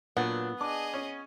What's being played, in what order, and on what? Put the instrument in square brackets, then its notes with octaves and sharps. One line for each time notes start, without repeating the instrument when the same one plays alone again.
[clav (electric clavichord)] A#2 [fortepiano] F#3 D4 [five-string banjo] B3
[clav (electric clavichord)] D4 [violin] G#4 D#5 [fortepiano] D6
[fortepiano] C#4